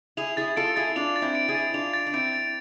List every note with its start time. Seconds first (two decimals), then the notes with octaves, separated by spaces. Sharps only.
0.17 E4 G#4 F7
0.37 E4 G#4 A6
0.57 F4 A4 D7
0.76 E4 G#4 A6
0.96 D4 F4 F7
1.16 A6
1.22 C4 E4
1.35 D7
1.49 E4 G#4
1.55 A6
1.74 D4 F4 F7
1.94 A6
2.06 D4
2.13 C4 E4 D7
2.33 A6